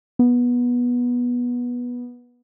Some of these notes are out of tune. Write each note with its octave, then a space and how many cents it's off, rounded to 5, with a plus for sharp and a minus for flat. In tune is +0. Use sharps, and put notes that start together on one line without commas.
B3 -15